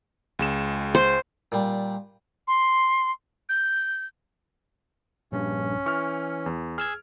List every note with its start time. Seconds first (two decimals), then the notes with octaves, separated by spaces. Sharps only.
0.39 C#2 G#3 E7
0.95 C5
1.52 A#2 G3
2.48 C6
3.49 G6
5.32 A#1 G2 C#4
5.86 E3 C#6 F6
6.46 E2
6.78 G#4 E6 F6 G#6